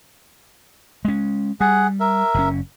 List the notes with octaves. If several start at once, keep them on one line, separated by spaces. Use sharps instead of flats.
G#3 C#4
G3 G#4 F#5
A#4 E5
F#1 B2 C#4